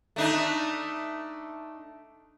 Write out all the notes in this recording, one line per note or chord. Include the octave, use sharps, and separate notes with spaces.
A3 D4 D#4